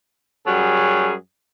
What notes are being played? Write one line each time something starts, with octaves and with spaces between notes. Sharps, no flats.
F#2 F#3 G3 G#4